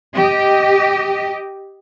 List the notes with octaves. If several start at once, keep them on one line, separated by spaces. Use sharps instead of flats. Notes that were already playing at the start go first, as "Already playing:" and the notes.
G4 D#5